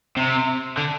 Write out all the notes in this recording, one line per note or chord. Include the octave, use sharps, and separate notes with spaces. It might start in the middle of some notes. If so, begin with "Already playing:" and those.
C3
D3